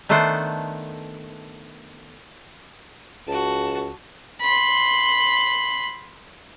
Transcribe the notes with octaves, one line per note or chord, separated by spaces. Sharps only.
D#3 A3 B3 D4 C5
C#2 F#4 A5
B5 C6